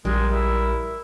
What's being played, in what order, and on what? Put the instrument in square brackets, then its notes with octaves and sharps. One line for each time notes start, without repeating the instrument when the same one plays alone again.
[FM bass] A#1 [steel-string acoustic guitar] G3 [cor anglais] G#3 [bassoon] A#4
[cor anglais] E4